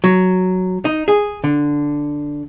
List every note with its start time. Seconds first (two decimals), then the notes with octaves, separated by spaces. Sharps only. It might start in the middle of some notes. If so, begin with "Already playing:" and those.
0.04 F#3
0.85 D#4
1.08 G#4
1.44 D3